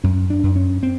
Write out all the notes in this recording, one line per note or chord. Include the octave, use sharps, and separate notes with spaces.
F#2 C#4
D4
F#2
C#4
C4